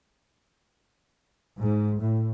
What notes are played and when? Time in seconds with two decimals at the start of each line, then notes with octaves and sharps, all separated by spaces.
1.61 G#2
2.00 A2